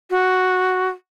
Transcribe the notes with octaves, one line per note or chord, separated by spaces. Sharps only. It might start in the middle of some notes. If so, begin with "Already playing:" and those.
F#4